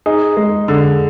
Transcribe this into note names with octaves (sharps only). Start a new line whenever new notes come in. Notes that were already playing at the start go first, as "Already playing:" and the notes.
D#4 G#4
G#3
D3